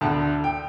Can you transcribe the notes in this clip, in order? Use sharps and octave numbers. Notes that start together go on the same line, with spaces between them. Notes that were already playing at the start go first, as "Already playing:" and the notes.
D2 D3 A5
G5